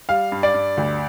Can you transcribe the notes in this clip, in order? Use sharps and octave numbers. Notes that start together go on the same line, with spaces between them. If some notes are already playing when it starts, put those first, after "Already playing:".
G3 F5
G2
D5
G2
D2